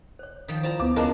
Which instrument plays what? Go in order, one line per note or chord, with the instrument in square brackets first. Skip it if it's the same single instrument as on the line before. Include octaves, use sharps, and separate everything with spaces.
[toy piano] C5 C#5
[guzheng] D#3 F3 G5
[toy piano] E4 F4 [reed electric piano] C5 [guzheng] D5 A5 A#5
[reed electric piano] D2 B3 [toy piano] F5 [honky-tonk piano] D6
[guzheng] C#3 G#3 A#3 [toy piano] E4 C5 D#5 [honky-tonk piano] A#4 A5